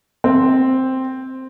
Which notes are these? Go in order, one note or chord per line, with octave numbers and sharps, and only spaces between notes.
C4